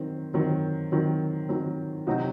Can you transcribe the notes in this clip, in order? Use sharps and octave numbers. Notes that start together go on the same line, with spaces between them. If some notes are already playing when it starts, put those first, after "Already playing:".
Already playing: D#3 F#3 C4
D#3 F#3 C4
D#3 F#3 C4
D#3 F#3 C4
C3 F#3 C4 D#4 F#4